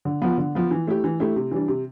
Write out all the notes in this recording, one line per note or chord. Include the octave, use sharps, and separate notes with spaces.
D3
F3 B3
D3
F3 B3
E3
A3 E4 G4
E3
A3 E4 G4
C3
E3 G3 D4
C3